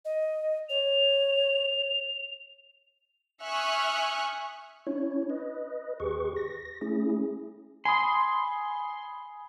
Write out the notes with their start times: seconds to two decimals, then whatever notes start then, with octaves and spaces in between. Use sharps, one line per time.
0.05 D#5
0.69 C#5 F7
3.43 E5 G#5 C#6 D#6 F6 F#6
4.87 C#4 D4 E4 C#5
5.30 B4 D#5
6.00 D#2 G4 G#4 B4 C#6
6.36 A#6
6.81 A3 C#4 E4 G#4
7.85 G#5 B5 C6 D#6